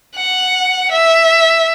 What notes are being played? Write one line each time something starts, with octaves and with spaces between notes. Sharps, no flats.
F#5
E5